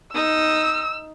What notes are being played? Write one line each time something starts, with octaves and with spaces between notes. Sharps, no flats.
D#4 D#6 E6